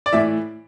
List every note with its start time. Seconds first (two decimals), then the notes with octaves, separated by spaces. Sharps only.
0.06 D5
0.12 A2 E3 E5